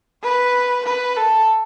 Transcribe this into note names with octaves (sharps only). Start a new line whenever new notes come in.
B4
B4
A4